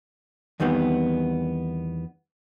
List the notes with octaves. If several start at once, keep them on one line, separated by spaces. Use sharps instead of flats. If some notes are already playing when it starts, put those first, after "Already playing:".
E2 D#3 G3 B3 C4